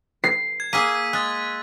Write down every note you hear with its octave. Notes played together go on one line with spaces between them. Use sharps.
C7
G#6
A#3 G#4 E6 B6 D#7
G#3 F#6 A6